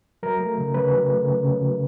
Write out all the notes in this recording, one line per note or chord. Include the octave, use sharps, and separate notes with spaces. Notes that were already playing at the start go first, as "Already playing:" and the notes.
F#3 A#4
A3
C#3
C#3 B4
F#3
A3
C#3
C#3
F#3